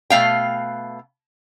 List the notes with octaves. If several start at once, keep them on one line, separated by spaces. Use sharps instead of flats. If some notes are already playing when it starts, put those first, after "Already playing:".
B2 A3 F5 G5